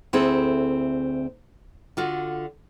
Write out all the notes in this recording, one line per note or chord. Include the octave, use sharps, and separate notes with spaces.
D2 C4 E4 G#4 A4
D3 F4 F#4